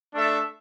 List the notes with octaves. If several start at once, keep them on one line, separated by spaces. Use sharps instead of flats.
A3 D4 A4 E5